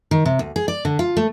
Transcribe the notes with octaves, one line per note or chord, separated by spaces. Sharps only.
D#3
C3
D2
G#4
D5
D3
F4
A3